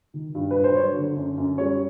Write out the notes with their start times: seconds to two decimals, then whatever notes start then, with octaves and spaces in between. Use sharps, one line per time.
0.14 D#3
0.35 G2
0.51 G2 B4
0.64 C5
0.75 F#3 C#5
0.97 D3
1.17 F#2
1.38 F#2
1.58 G3 C#5